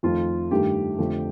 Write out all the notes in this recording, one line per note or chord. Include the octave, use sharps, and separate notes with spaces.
F2 D#3 A3 F4
G2 D#3 A3 G4
F2 D3 F3 A3